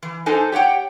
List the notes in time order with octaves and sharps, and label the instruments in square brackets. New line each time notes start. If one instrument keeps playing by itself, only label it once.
[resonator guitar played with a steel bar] E3
D4 D#4 A4 C5 G#5
G4 C#5 F#5 G5